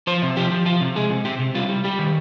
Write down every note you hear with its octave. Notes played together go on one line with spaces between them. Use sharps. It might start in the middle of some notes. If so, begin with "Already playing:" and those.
F3 C5
C3
F3 G4
F3
F3 F4
C3
G#3 G#4
C3
C3 G4
C3
G3 F4
G3
G3 G4
D#3